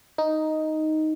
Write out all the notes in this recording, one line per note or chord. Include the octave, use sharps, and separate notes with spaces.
D#4